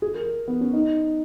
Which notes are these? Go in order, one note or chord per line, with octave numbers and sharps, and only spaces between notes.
G#4
A#4
A#4
B3
C#4
D#4